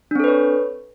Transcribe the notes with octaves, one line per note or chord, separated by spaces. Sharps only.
C4 D4 A4 B4 C#5